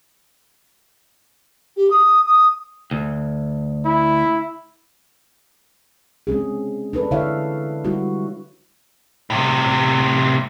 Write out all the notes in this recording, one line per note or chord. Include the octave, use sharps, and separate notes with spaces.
G4
D#6
D#6
D2
E4
G#3 C4 C#4 G#4
D4 A4 B4
D3 E4 A4 C#5 E5 F5
G3 G#3 E4 F#4
A2 C3